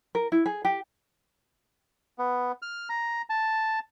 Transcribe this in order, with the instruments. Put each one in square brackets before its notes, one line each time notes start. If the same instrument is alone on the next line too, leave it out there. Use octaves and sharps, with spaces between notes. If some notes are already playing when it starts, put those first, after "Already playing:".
[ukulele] A#4
E4
G#4
G4
[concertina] B3
F6
A#5
A5